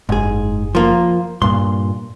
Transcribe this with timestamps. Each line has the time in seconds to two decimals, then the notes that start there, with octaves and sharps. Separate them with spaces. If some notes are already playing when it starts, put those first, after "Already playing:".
0.09 F#1 G#2 G#4
0.75 F3 A#3
1.42 G2 A#2 C6